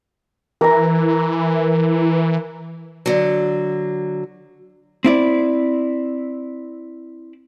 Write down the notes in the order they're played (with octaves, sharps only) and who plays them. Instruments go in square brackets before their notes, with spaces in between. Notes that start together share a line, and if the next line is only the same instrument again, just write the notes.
[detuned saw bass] E3 [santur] A#4 A#5
[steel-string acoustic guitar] D3 F#3
[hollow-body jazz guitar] C4 E4 D5